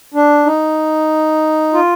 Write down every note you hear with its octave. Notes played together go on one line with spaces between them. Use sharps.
D4
D#4
F4